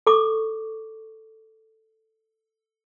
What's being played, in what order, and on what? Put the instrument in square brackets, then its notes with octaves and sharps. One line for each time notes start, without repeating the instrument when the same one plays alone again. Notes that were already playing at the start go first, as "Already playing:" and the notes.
[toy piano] A4 C#6 D6